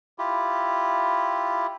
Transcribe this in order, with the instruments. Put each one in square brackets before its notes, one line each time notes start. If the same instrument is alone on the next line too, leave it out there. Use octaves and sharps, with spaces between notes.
[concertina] E4 F4 G4